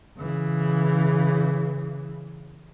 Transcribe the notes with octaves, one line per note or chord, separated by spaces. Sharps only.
C#3 E3